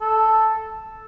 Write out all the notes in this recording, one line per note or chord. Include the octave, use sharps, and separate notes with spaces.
A4